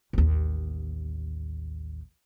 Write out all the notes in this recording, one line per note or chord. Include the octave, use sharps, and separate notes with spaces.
A1 D#2